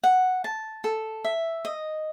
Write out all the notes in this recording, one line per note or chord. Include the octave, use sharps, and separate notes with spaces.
F#5
A5
A4
E5
D#5